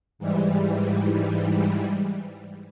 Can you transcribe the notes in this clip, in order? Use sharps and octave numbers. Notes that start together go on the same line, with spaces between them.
G#2 E3 G3